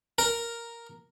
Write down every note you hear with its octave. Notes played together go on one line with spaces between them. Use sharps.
A#4